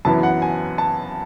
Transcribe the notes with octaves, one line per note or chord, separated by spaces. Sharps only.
F#2 E3 B3 E4 A5
F#5
G#5
A5